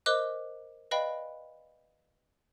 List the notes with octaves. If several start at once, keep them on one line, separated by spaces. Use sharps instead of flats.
A#4 C5 D#5 D6 F#6
B4 D5 D#5 F5 G5 B5